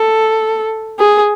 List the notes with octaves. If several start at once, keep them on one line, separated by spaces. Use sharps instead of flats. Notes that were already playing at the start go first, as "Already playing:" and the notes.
Already playing: A4
G#4